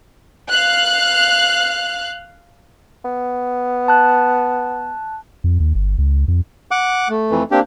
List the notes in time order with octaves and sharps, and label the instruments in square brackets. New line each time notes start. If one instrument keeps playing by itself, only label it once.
[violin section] F5 F#6
[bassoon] B3
[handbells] A5 F#6
[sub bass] F2
D#2
G1
C#2
F2
[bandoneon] F#5 D6
[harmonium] A3
[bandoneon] F2 E3
[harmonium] A#3 C4 D4 [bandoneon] G4